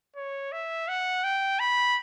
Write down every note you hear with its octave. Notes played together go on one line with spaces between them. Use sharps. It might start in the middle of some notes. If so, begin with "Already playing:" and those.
C#5
E5
F#5
G5
B5